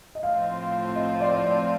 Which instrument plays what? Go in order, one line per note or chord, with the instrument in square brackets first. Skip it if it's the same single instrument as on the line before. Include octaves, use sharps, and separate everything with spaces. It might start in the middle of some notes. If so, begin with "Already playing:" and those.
[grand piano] D#5
[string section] A2 F3 C4 F4 [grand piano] F5
[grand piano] D#5
D5
D5